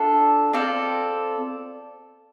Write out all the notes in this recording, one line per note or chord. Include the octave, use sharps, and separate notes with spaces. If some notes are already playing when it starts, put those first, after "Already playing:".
Already playing: D4 F4 A4
C4 F4 A4 D5